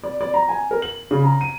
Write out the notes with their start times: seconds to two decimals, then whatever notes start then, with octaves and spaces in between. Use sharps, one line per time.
0.04 D5
0.21 D5
0.34 A#5
0.49 G#5
0.71 A#4
0.82 F#7
1.11 C#3
1.24 A#5
1.41 D#7